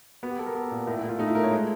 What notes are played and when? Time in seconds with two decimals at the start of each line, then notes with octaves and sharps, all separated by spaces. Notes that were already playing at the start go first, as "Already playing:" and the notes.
0.23 B3 F#4
0.30 G4
0.39 B3 A4
0.46 A#4
0.55 B3 A4
0.71 A#2
0.87 A2 A#4
0.97 E4
1.03 A2
1.09 F4
1.19 A3 D#4
1.27 E4
1.35 A3 A#4
1.43 C#5
1.51 G#3